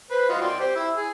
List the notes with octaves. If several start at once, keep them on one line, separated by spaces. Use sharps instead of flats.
B4 C5
F4 F#4 D#5
D5 G5 C6
G4 C5
E4
G#4